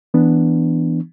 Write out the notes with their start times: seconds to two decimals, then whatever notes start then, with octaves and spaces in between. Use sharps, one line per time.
0.14 E3 B3 D4